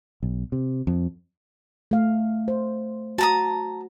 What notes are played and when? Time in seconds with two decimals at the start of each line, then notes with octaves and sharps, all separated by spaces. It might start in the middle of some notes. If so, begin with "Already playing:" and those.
0.23 B1
0.52 C3
0.87 F2
1.91 A3 F5
2.48 C5
3.18 F#4 A5 A#5 D#6